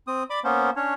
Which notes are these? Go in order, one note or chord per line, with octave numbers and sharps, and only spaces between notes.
C4 D#6
D5 B5 D6
A#3 B3 C#4 C5
C#4 D4 C#5